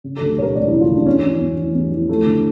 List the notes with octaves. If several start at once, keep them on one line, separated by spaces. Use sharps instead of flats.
C#3
D2 A4
E1 A#4 C#5
E1 D5
C#3 E4
F4
D2 D4
E2 C#4
E3
E2
E3
E2
E3
F3 A3
D3